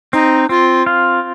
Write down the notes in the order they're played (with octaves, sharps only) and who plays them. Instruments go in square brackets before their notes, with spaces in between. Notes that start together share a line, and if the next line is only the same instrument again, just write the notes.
[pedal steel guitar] C4 [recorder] D#4
[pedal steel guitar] C4 [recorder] F4
[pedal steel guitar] F4